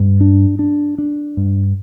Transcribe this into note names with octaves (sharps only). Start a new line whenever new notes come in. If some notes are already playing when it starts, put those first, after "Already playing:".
Already playing: G2
D4
D4
D4
G2